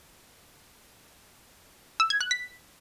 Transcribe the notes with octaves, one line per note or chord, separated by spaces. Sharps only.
E6
G#6
F#6
B6